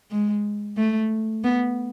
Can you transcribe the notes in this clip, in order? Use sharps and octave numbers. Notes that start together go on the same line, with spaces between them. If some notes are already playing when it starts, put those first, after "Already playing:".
G#3
A3
B3